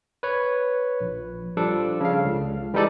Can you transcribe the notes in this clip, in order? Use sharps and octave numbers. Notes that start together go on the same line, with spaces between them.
B4 C#5
A#1
F3 G3 D4 A4
C#3 F5
C#2
E3 G3 G#3 D#4 A4 D5